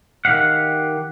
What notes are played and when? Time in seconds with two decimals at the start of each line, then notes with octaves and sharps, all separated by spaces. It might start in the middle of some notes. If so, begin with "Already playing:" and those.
0.25 D#3 G4 F5 F#5